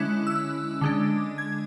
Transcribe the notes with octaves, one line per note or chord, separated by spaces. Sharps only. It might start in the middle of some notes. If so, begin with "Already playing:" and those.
Already playing: D3 G#3 C#4 E4 F#6
E6
D3 G#3 D4
G#6